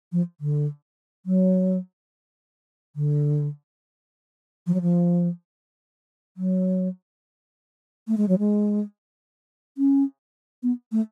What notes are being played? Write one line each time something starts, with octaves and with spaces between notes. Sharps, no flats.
F3
D3
F#3
D3
F3
F#3
F3
F#3
A3
G#3
F#3
G#3
C#4
B3
A3